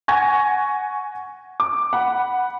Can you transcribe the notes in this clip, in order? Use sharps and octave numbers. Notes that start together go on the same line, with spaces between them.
F#5 G#5 C#6 G#6 A#6
D6
F#5 B5